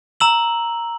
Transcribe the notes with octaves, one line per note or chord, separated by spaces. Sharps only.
A#5 E6 F#7